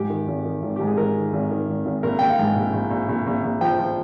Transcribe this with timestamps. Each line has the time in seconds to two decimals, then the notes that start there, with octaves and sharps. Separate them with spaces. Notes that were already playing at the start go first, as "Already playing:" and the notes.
Already playing: G#2 G4
0.10 D#3
0.27 G#1
0.45 D#3
0.62 G#1
0.76 G#2 G4
0.87 G#4
0.97 G#2 A#4
1.16 D#3
1.32 G#1
1.51 D#3
1.68 G#1
1.85 G#1
2.03 A#1 A#4
2.19 A#1 G5
2.30 F5
2.39 G#2
2.56 A#1
2.73 A#1
2.90 A#1
3.09 A#1
3.27 A#1
3.43 A#1
3.61 F3 G5
3.79 F3